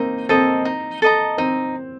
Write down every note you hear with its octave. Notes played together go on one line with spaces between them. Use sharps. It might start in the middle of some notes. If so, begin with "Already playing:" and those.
Already playing: A#3 C4 D#4
C4 A4 D#5 A#5
D#4
A4 D#5 A#5
C4 D#4